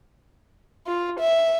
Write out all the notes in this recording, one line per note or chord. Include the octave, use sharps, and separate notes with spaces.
F4
E5